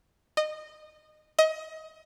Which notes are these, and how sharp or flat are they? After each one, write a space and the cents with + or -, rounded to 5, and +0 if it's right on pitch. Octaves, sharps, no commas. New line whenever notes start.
D#5 -20
D#5 +25